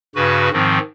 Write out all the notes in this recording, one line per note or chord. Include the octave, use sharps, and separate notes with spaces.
G2 C#3 F#4 B4
G#2 D#3 F3 C4